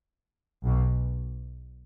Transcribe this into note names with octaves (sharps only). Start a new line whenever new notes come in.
B1 B2